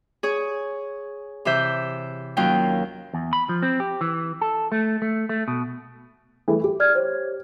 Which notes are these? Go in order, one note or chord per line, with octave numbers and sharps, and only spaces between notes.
G#4 C#5
C3 E3 C5 E5 G6
D#2 F#3 C#4 F4 G5
E2
B5
F3
C4
G4
E3
A4
A3
A3
A3
B2
E3 A3
G4
D5 F6 G#6
C5 C#5